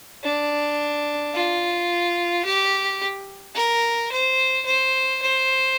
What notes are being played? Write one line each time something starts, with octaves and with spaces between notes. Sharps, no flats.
D4
F4
G4
A#4
C5
C5
C5